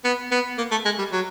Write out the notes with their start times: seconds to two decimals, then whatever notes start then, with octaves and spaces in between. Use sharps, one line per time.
0.05 B3
0.31 B3
0.58 A#3
0.71 A3
0.85 G#3
0.98 G3
1.12 F#3